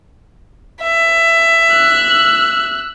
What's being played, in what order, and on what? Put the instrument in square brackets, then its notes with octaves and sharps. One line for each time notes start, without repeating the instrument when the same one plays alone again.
[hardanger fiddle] E5
[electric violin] E6 F#6